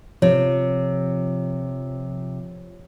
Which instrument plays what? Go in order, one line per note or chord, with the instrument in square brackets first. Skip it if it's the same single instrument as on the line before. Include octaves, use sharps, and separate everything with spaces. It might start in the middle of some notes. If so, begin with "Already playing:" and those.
[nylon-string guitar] C3 [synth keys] F3 [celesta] C#5